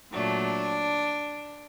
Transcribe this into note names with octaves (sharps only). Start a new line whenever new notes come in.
A#2 F#3 A3 D4